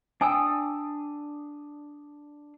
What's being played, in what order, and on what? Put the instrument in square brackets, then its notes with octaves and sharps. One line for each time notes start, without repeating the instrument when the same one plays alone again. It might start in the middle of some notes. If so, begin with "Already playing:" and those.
[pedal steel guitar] D4 D#6 E6 [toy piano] G5 G#5